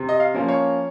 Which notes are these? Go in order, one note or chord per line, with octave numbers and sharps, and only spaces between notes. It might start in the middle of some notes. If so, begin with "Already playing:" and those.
Already playing: C3
D#5
F5
F3 A#3 C#4
C#5